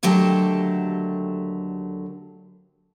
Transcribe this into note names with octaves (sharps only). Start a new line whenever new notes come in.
D#2 D3 F#3 A3 G4 A5